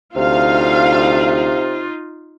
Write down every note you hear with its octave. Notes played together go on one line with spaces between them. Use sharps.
D2 C3 D#4 F4 F5